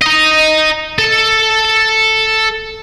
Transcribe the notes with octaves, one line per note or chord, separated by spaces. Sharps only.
D#5 A#5
A4